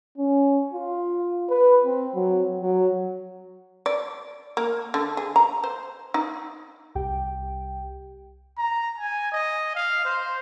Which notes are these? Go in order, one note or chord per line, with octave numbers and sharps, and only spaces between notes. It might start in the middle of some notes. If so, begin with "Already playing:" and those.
C#4
F4
B4
C4
F#3
F#3
D5
A#3
D3
G#4
A#5
C5
D#4
C2 G4 G5
A#5
G#5
D#5
F5
C5